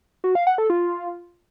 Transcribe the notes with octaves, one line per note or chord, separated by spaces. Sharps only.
F#4
F5
F#5
A4
F4